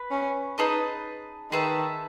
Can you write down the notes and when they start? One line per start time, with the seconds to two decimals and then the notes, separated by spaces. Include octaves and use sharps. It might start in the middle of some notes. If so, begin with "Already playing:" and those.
Already playing: B4
0.11 C#4
0.58 D#4 G#4 B4 D#5 A5
1.52 D#3 G#4 B4 E5 A5